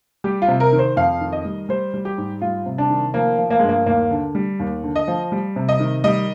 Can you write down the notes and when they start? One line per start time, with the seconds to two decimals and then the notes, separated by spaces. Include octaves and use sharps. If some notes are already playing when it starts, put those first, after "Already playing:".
0.24 G3 G4
0.42 F4
0.48 C3
0.60 A#4
0.72 D#3
0.79 C5
0.96 F2 F5
1.21 D#3
1.32 D#5
1.45 G3
1.69 G3 C5
1.94 G3
2.05 G4
2.18 G#2
2.42 G3 F4
2.66 C3
2.78 D4
2.90 D#3
3.14 F3 A#3
3.38 F3
3.50 A#3
3.59 G2 G#3
3.69 A#3
3.86 D#2 A#3
4.11 D3
4.35 G3
4.60 D#2
4.83 D3
4.96 D#5
5.08 F3
5.32 G3
5.56 C3
5.69 D#5
5.80 D#3
6.04 G3 D#5